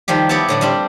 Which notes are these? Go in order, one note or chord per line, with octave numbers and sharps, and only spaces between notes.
D#3 F3 G3 G4
B3 E4 G4 C#5 D5 A5
A2 D3 B3
G3 C4 D4 F4 G4